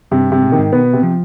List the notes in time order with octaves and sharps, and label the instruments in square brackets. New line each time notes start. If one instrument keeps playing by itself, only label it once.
[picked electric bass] G2 [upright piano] C3
[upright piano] C3
[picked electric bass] G#2
[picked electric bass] B2 [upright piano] D#3
[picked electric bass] G#2
[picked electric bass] B2 [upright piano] B3
[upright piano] C3
[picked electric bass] F3